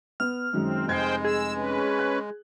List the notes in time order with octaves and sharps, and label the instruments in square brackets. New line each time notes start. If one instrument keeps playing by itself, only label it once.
[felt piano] B3 [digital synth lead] F6
[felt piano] F#2 D#3 G#3 [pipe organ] C4
[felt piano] F1 G#6 C7 [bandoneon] G#3 [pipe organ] G#4 C5 G5
[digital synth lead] G#4 [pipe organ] E6
[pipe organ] C#4 B4
[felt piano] F#6